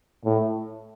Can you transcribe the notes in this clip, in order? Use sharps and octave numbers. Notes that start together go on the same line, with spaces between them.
A2